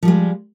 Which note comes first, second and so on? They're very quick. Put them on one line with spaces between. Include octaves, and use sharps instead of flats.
F3 G3 G#3